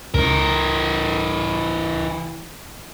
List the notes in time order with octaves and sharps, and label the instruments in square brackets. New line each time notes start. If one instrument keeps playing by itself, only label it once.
[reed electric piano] C#2 [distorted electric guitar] E3 A#4